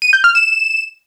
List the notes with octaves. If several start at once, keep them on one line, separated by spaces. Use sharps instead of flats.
D#7
G6
F6
E7